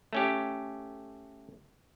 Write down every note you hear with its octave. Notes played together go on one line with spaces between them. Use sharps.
A3 C#4 G4